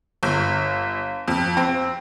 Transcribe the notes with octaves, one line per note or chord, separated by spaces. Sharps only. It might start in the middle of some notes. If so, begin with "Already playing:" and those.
G1
F2
C4